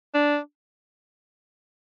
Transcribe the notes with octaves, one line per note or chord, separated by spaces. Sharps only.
D4